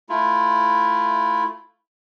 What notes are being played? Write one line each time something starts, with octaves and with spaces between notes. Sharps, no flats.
A3 E4 F4